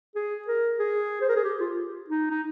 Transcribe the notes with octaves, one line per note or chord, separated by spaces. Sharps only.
G#4
A#4
G#4
C5
A#4
G#4
G4
F4
D#4
D#4